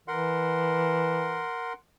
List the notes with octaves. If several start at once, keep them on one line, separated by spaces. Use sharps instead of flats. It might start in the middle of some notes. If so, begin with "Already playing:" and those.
E3 A#4 F#5 C6